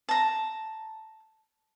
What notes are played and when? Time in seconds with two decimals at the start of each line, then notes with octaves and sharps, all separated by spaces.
0.09 A5 A#5